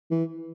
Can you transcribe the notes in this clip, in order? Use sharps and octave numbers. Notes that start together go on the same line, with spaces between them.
E3